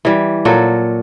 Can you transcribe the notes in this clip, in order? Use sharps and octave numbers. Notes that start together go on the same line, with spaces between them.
E3 G3
A#2 F#3 F#4 A4